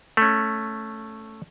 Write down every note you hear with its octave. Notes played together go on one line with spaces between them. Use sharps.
A3 C#4